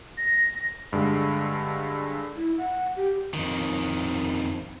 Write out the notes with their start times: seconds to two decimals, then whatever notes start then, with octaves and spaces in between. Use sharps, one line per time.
0.18 A#6
0.93 G2 D3 G#3
2.37 E4
2.58 F#5
2.96 G4
3.34 F2 D#3